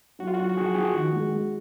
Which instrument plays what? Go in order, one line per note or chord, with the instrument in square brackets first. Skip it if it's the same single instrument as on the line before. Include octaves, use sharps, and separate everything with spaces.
[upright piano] F#3 [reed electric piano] F#4
[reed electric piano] F4
[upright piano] F#3 [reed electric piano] F#4
[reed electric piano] F#4
[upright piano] F3 [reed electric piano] G#4
[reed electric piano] F#4
[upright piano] F3 [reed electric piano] G#4
[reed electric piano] F#4
[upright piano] D#3
G#3
G#3